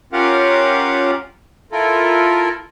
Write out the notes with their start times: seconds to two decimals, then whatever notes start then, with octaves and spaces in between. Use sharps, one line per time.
0.13 C#4 F4 G4 A#4 F5 F#5
1.72 E4 F4 A4 A#4